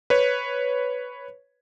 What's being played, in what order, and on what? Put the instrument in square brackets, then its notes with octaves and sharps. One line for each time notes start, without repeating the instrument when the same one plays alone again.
[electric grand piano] B4 C#5